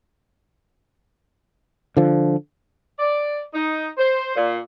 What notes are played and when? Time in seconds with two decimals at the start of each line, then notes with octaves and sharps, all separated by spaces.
1.97 D3 F3
2.99 D5
3.53 D#4
3.98 C5
4.35 A#2